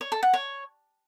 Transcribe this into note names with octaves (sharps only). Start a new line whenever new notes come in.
C#5
A4
F#5
C#5